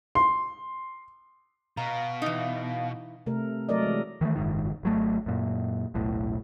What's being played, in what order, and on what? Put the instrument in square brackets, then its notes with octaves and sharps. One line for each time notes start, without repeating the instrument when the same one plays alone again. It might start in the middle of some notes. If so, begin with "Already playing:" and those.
[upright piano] C6
[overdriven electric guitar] B2 [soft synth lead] F5 [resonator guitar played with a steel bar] A#5
[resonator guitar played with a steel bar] E3 D#4
[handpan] C3 A3 A#4
F#3 A3 A#4 D5 D#5
E3 G#3
[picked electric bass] D#3 E3 G3 A3
F#1 B1 G#2 D#3
G#1 F#3 A3
F#2 A#2
E1 B1 A2